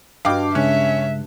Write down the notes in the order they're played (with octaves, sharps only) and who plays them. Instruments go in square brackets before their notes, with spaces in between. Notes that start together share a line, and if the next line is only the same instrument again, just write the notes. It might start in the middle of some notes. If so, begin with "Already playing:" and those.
[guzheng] G2 [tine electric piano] F#4 D#5 A5 [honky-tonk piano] F5 G5 D6
[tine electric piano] C#3 G#3 F#6 [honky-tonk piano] C#4 [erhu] E5